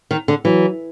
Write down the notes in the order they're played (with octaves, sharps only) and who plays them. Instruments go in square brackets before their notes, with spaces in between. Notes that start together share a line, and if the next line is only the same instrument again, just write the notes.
[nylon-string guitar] D#3
D3
[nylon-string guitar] E3 [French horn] F#3